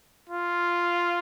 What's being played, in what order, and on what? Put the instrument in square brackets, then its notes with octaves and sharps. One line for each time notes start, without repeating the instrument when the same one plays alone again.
[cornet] F4